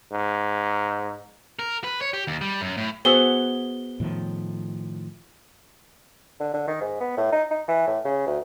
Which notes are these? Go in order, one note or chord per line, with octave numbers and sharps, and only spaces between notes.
G#2
A#4
B4
C#5
G4
D#2
G3
F#2
A2
B3 F#4 G#4 C5 E6 G7
A2 D#3 F3
D3
D3
D#3
G#2
B3
A2
D#4
D#4
E3
A2
C#3
D2